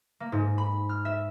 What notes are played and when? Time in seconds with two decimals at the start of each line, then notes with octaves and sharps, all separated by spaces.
0.20 A#3
0.32 G#2
0.58 B5
0.89 F6
1.05 E5